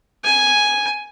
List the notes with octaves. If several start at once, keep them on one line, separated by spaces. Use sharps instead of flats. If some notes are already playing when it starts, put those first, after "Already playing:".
G#5